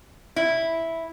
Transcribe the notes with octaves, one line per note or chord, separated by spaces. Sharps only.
E4